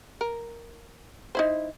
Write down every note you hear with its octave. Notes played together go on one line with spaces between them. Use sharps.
A#4
D#4 E4 C5